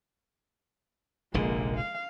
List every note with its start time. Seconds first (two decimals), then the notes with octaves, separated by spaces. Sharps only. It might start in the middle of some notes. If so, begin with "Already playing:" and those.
1.34 F1 A#1 D3 G#3 A#3
1.76 F5